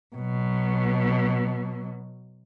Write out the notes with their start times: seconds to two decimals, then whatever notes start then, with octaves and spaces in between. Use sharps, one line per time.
0.16 B2 F#3